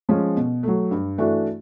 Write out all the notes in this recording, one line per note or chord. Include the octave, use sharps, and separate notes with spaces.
F3 G#3 C#4
B2
F#3 A3
G2
E3 A3 D4 F#4